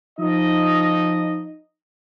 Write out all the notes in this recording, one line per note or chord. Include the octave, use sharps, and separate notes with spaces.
F3 D#4 D#5